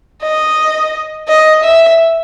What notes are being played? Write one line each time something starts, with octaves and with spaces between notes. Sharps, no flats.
D#5
D#5
E5